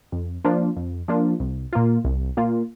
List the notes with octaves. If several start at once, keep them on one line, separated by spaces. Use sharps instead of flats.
F2
F3 A#3 D4 F4
F2
F3 A#3 D4 F4
C2
A#2 A#3 F4
C2
A#2 A#3 F4